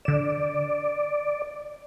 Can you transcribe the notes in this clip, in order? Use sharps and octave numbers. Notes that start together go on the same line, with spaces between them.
D3 D5 E7